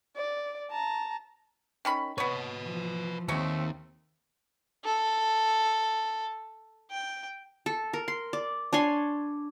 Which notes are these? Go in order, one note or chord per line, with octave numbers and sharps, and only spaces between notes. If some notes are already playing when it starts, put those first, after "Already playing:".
D5
A5 A#5
D#3 C#4 B5
B3 B4 C#5 D#5
E3 F3
D#2 A3 C4 C#5 D#5
A4
G5
A4
A#4
C6
D5
D4 C#5 G#5 C6